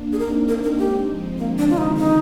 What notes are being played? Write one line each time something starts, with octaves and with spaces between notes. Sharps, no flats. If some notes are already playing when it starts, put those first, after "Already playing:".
Already playing: A#3 D4
G#4
C4 D#4 A#4
A#3 D4 A#4
A#4
G#3 C4 G4
F3 G#3
D3 F3 A#3
D4
C3 D#3 F4
D#4
D#4